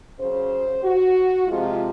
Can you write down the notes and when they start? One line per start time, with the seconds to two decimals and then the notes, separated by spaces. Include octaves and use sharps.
0.19 C#3 F#3 C5
0.83 F#4
1.48 C3 F3 G#3 F4